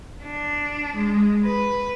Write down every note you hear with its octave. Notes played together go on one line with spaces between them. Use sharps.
D4
G#3
B4